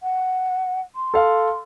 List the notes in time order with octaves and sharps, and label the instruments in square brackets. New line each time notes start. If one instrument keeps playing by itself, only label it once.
[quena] F#5
C6
[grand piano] A4 F5